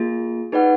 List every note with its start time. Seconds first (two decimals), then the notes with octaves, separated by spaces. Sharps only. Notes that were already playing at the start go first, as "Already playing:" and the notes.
Already playing: A#3 F4 G#4
0.52 D#4 G#4 B4 D5 F#5